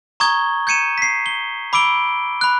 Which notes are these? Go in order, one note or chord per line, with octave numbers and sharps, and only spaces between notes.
A#5 C#6 D#6 G#6 G7
G6 G#6 C#7 D#7 E7
B6 C7
G7
B5 D6 E6 D7 G7
B5 F#6